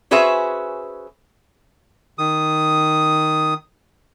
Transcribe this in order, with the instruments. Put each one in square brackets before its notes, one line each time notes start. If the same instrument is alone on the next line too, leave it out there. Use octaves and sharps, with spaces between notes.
[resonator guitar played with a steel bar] C#4 F#4 G#4 B4 C5 E5
[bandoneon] D#3 D#6